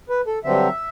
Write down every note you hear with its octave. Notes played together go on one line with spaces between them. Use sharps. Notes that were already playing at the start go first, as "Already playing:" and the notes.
B4
A4
G2 D3 F#3 C4 E5